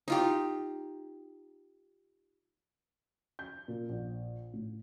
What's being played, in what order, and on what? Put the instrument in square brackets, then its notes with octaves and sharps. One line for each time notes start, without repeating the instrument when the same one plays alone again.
[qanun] D#4 F4 G4
[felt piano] G6
A#2
A#1
A2